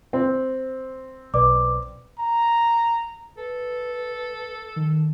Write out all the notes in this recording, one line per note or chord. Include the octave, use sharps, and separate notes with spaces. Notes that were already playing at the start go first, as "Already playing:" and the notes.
C4
B1 B4 D5 D6
A#5
A4 B4
D#3